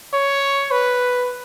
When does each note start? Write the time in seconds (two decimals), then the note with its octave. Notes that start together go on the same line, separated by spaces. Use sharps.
0.13 C#5
0.71 B4